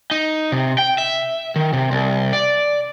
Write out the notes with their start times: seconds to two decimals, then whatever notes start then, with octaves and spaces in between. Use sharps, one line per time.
0.11 D#4
0.52 C3
0.78 G5
0.98 E5
1.56 D#3
1.73 C3
1.92 C2
2.33 D5